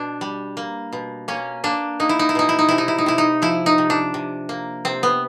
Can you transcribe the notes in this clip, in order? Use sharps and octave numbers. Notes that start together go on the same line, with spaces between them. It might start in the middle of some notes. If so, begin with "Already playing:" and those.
Already playing: B2 D4
G3
A#3
B2
A#3 C#4
A#3 D4
A#3 D#4
E4
D#4
E4
B2 D#4
E4
D#4
C3 E4
D#4
E4
D#4
C3 E4
D#4
F3 E4
D#4
C3
D4
C3
A#3
C3 C4
B3